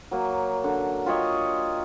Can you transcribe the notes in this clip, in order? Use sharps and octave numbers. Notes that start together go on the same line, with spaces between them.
F#3 A#3
D3
F4 G4 C#5 D#5